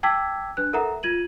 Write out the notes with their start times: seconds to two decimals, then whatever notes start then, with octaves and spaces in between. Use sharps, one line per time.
0.03 G5 A5 D6 E6 G#6 B6
0.57 D4 B4 F#6
0.73 A4 A#4 E5 F#5 A#5
1.03 F4 G#6 D#7 F#7